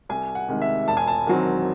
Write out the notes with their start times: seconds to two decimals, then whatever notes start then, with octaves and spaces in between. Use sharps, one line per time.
0.09 C2 G#5
0.35 F#5
0.49 C3 D#3 G#3
0.62 E5
0.88 E1 A5
0.97 G#5
1.07 A5
1.27 E2 D#3 F#3 C4